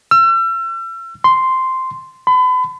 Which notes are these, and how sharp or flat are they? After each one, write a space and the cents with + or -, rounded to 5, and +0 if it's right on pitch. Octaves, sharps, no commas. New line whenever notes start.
E6 +40
C6 -5
B5 +35